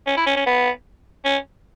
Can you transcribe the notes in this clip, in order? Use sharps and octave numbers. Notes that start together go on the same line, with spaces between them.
C#4
E4
C#4
C#4
B3
C#4